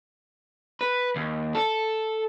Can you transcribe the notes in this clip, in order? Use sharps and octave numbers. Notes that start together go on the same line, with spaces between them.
B4
D#2
A4